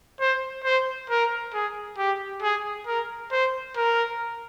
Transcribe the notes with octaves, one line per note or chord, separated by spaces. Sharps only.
C5
C5
A#4
G#4
G4
G#4
A#4
C5
A#4